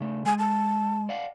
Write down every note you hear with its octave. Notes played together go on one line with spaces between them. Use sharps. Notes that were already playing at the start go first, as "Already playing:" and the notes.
C#3 A3
G#3 G#5
A5
D5 F5 F#5